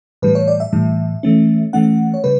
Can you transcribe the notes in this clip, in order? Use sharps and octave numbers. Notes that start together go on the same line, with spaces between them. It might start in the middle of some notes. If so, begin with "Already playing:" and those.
A2 E3 G3 B4
C#5
D5
E5
A2 E3 G3
E3 A3 C#4
E3 A3 C#4 F#5
C#5
C#3 G3 B4